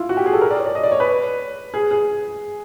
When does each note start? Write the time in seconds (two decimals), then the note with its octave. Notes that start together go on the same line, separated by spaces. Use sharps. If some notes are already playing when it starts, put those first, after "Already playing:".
Already playing: E4 F4
0.09 F#4
0.17 G4
0.26 G#4
0.33 A4
0.41 A#4
0.51 D5
0.59 C#5
0.66 D5
0.75 D#5
0.83 D5
0.92 C#5
1.00 B4
1.74 G#4
1.91 G#4